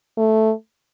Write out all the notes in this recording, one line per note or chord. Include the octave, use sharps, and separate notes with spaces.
A3